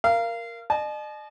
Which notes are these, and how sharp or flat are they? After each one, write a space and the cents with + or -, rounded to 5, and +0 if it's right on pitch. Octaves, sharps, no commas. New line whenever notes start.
A#4 +0 F5 -25
D#5 -45 A5 -45